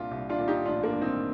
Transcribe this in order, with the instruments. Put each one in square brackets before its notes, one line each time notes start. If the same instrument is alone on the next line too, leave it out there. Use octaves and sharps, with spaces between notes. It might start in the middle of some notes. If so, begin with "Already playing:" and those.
Already playing: [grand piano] C2 A#2 D4 F4
C2
D4 F4
A#2
D#4 G4
A1 D4 F4
A#3 D4
G2
C4 D#4